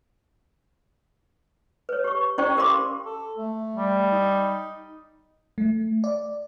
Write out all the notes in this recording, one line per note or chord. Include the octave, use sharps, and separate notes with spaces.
B4 C#5
G4 C#6
C#4 E4 C5 D5 G5 C#6
G4 A#4 F5 B5 C6 D6
A4
A3
G3
D#4
A3
D5